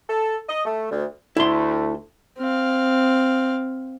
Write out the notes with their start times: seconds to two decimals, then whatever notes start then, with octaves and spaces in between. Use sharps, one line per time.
0.08 A4
0.48 D#5
0.65 A3
0.91 D2
1.37 D2 A3 E4 C6
2.38 C4 F5